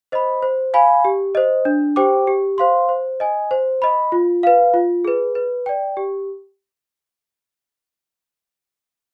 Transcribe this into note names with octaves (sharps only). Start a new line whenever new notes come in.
C5 D#5 B5
C5
F5 G#5 B5
G4
C5 D#5
D4
G4 C5 G5 D6
G4
C5 F5 C6
C5
D#5 G#5
C5
D#5 B5
F4
B4 F5
F4
G#4 B4
B4
D5 G5
G4